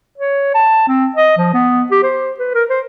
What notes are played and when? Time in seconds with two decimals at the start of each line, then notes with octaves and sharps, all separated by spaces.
0.18 C#5
0.54 A5
0.88 C4
1.16 D#5
1.38 F3
1.54 B3
1.91 G4
2.03 C5
2.39 B4
2.54 A#4
2.70 C5